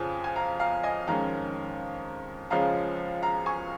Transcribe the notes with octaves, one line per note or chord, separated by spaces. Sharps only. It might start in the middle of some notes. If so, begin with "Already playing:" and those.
Already playing: F2 C#3 F3 G#5
G#5
F5 A#5
F5 A#5
D#5 G#5
F2 D#3 G#3 C#4 F5 A#5
C#2 C#3 F3 G#3 C#4 F5 A#5
F5 A#5
G#5 C#6